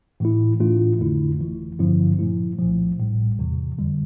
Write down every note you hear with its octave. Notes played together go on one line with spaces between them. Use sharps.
A2 E3 A3 E4
A2 E3 A3 D4 F4
F2 D3 A3 E4
G1 F2 E3
G2 D3 F3 C4 E4
A#2 F3 A3 E4
C2 A#2 F3
A1 A2 G3
E2 C3 E3
F2 D3 G3